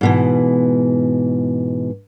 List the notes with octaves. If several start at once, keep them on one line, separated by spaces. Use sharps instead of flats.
G#2 B2 E3